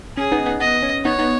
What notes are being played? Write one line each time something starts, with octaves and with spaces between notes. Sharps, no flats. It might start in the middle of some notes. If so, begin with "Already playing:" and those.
C#4 G#4
B3 D#4
B3 D#4
B3 D#5
C#4
B3 D#4 C#5
B3 D#4